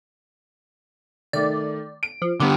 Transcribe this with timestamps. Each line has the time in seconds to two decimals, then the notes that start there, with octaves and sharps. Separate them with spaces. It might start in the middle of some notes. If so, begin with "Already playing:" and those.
1.33 D#3 A3 D5
2.03 D7
2.22 F3
2.40 D3 G3 B3 G4